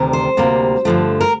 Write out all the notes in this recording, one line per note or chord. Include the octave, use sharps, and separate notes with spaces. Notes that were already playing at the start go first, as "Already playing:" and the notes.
Already playing: D2 C3 D#3 G3
C5
D2 C3 G3 A#3
G2 D3 F3 A3
A#4